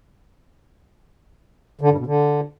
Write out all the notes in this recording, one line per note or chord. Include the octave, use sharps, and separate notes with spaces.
D3
G2
B2
D3